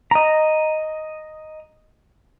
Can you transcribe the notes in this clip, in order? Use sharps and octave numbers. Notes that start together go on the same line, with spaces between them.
D#5 A#5